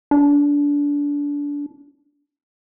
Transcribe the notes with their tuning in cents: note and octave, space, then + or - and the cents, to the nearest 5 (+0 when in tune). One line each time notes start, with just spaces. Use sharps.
D4 -25